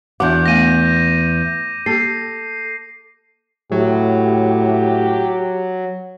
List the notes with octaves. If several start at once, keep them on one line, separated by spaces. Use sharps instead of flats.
E2 B3 D4 F#4 F#5 D6 G6
A3 F5 G#5 A#6 D#7
A#3 G4 A4 C7
A2 F#3 G4